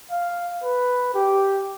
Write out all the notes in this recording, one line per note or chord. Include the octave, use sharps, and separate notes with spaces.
F5
B4
G4